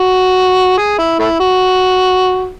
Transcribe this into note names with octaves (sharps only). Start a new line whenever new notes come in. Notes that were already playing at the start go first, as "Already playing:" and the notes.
Already playing: F#4
G#4
E4
A3 E4
F#4